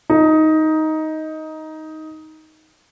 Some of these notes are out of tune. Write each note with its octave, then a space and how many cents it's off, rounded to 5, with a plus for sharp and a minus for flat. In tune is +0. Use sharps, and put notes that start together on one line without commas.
D#4 +10